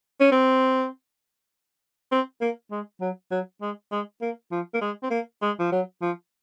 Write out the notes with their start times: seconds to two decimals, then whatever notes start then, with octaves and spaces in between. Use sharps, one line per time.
0.21 C#4
0.32 C4
2.12 C4
2.41 A#3
2.72 G#3
3.01 F#3
3.31 F#3
3.62 G#3
3.92 G#3
4.22 A#3
4.52 F3
4.74 A#3
4.82 G#3
5.03 C4
5.11 A#3
5.42 G#3
5.59 F3
5.72 F#3
6.02 F3